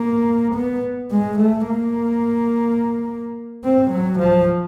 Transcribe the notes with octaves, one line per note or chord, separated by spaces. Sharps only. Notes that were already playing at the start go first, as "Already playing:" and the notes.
Already playing: A#3
B3
G#3
A3
A#3
C4
F#3
F3